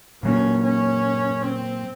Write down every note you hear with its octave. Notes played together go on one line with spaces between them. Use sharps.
A#2 F#3 A#3 C#4
C#4
C4